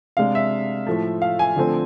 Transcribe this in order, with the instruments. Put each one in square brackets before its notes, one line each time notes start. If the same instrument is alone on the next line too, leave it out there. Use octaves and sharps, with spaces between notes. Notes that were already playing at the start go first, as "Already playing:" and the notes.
[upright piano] C3 G#3 D4 F5
E5
A2 F3 A3
F5
G#5
D3 F3 A3 C4